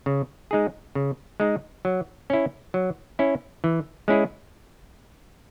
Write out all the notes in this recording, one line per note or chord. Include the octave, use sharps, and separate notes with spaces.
C#3
G#3 D#4 G#4
C#3
G#3 D#4 G#4
F#3
C#4 E4
F#3
C#4 E4
E3
G#3 C#4 E4 G#4